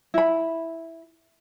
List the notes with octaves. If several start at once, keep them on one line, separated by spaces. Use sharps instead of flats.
E4 B5